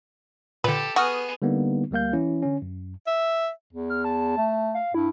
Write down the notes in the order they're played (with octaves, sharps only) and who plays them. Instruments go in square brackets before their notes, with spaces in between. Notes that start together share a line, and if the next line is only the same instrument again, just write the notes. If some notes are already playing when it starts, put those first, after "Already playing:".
[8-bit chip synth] A#2 D3 [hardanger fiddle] G4 A4 [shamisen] B4
[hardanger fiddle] B3 G#4 [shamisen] F#4 [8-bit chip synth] C#6 D#6 F6
[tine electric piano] D3 G3 A#3 B3 D#4
D2 G3 A#3 F5 G6
E3 C#4 E4
D3 C#4
F#2
[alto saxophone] E5
[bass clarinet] E2
[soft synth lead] F6
A5
[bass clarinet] A3
[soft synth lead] F5
[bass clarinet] G2 [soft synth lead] E4